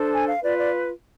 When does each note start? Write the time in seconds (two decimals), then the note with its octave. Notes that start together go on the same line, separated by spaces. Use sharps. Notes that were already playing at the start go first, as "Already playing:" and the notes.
Already playing: D4 A4 C5
0.14 G#5
0.28 F5
0.43 F4 B4 D5
0.58 D5